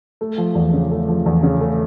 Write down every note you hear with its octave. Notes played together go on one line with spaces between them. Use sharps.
A3
F3
E2
C#3
A3
F3
E2
C#3
A3